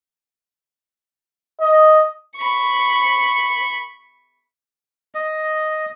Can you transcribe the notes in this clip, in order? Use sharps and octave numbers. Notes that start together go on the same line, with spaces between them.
D#5
B5 C#6
D#5